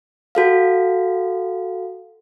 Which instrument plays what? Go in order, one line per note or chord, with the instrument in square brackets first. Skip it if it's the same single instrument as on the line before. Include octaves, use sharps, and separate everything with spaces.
[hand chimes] F#4 A4 F5